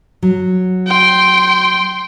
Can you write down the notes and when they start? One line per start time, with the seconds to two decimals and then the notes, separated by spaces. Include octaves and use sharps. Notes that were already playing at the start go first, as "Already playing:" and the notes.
0.23 F#3
0.87 G5 C6